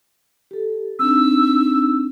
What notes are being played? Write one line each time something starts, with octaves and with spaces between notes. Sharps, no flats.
G4 A4
C4 D4 D#4 E6